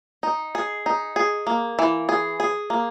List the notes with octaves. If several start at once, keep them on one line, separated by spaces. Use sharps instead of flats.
D#4
G#4
D#4
G#4
A#3
E3
G#4
G#4
A#3